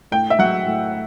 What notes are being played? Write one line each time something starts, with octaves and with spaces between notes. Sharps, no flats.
A2 G5
E5
F#3 F#5
A2